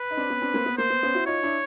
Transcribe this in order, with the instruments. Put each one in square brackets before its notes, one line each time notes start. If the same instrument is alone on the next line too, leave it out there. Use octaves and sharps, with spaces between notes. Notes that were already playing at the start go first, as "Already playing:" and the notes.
Already playing: [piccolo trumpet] B4
[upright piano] D#4
C4 D4
B3 C#4
C4 D4
A#3 C4
B3
[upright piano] A#3 [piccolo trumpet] C5
[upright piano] B3
B3 C#4
E4 F#4
[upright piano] D#4 F4 [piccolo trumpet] C#5
[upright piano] D4 E4